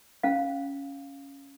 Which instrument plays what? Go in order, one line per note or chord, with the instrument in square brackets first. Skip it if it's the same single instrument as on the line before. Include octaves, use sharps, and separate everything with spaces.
[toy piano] C#4 F5